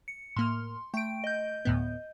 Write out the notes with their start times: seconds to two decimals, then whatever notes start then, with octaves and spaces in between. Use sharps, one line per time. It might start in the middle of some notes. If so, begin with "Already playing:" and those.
0.08 C#7
0.36 A2 A#3 C6 F6
0.94 A3 G5 D7
1.24 D#5 G6
1.65 D2 A2 B3